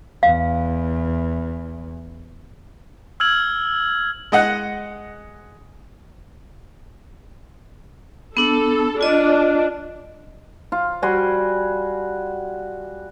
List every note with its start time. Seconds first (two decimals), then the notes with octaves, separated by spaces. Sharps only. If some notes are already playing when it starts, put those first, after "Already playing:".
0.23 E2 F5
3.20 E6 F6 G#6 F#7
4.32 G#3 D#5 F#5 F#6
8.37 B3 D4 A4
9.01 D4 F4 D#5
10.72 F4
11.02 G3 F#4 G#5 C6